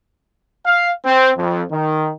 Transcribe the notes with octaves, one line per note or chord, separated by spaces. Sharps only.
F5
C4
F2
D#3